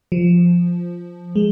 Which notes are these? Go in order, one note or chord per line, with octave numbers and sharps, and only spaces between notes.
F3
G#3